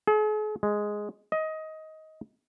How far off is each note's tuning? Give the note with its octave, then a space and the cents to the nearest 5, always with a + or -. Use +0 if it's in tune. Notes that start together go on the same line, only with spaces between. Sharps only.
G#4 +45
G#3 +0
D#5 +15